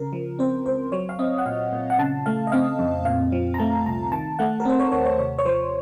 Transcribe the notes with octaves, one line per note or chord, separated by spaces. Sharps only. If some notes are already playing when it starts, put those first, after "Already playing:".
Already playing: C#3 A#4
F3
C4 C5
C#2 C5
F#3 C#5
F5
C4 D#5
F#5
A#2 F5
A#2
F#5
C#3 A5
A3 F5
D#5
C4 F5
F2
A#2 F5
F3
A#5
A3 A5
C2 A#5
D#3 A5
A3 F#5
A#4
C4 C5
C#5
D#2 C#5
C#5
C3 C#5
C#5
F3 C5